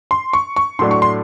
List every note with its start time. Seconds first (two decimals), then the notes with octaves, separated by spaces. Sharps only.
0.11 C6
0.33 C#6
0.56 C#6
0.79 A2 F#3 A3 D4 C6
0.91 C#6
1.02 C6